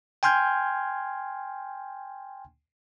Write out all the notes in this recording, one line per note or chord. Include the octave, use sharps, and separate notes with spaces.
G5 G#5 C6 F6 G6 G#6